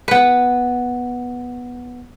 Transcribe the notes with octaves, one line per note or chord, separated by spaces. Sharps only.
B3 B4